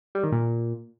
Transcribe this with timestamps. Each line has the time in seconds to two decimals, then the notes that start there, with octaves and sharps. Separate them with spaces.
0.15 G3
0.24 D#3
0.32 A#2